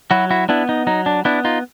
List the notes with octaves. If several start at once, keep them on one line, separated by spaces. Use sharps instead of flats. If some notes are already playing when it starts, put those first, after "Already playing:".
F#3 E4 F#4
E4 F#4
B3 D4 E4
D#4
F#3 D#4
D4
B3 D4 E4
D#4 F4